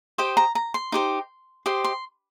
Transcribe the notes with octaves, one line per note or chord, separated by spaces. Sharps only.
G4 C5 D#5 G5
A#5
A#5
C6
D#4 G4 C5
G4 C5 D#5 C6
C6